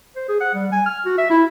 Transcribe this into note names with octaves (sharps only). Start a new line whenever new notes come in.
C5
G#4
F#5
G3
G#5
F6
F#4
E5
E4